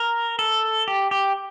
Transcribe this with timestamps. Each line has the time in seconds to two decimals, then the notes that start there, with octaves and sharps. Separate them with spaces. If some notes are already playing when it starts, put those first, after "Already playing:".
Already playing: A#4
0.39 A4
0.88 G4
1.11 G4